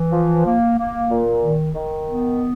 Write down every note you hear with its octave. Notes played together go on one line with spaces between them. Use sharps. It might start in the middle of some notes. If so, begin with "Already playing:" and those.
Already playing: E3
F3
A#3
A#3
A#2
D#3
D#3
B3